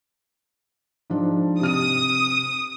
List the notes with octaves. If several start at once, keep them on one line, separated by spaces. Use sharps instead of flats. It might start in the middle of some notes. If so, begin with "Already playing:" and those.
G#2 F3 D4
C3 D#6 F6 D#7